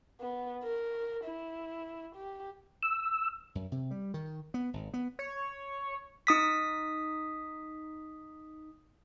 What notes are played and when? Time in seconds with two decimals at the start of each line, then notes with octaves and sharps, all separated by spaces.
0.21 B3
0.64 A#4
1.25 E4
2.16 G4
2.83 E6
3.55 F#2
3.72 C3
3.91 G3
4.14 D#3
4.54 B3
4.73 G#1
4.94 B3
5.19 C#5
6.27 D#4 D#6 B6